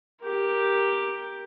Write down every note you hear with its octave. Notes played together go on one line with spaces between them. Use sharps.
G4 A#4